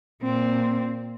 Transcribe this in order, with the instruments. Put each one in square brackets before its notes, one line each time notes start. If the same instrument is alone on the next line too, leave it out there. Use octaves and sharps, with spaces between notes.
[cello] A#2 C4